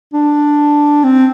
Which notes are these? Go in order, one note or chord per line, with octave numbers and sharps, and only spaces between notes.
D4
C4